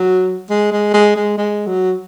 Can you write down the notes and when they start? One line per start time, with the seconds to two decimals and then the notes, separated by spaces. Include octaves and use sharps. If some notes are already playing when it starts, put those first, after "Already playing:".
Already playing: F#3
0.50 G#3
0.72 G#3
0.94 G#3
1.16 G#3
1.38 G#3
1.67 F#3